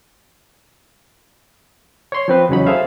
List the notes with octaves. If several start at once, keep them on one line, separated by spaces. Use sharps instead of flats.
C#5 C6
F3 C4 B4
E2 C#3 F#3 C#4 D#4 B5
G#4 A4 C5 E5 F5